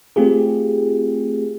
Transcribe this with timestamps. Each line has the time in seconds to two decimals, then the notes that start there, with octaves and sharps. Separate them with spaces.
0.16 A3 C4 F4 G4 G#4